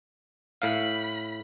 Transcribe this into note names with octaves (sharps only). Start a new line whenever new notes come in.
A2 F5 B5